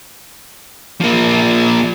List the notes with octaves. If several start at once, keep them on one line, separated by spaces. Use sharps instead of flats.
F3 A#3